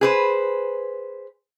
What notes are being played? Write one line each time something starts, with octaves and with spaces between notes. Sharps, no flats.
G#4 B4 C5